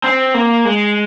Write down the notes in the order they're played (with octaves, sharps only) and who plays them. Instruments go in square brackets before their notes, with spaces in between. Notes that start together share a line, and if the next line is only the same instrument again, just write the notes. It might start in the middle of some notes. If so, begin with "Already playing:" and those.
[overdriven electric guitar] C4
A#3
G#3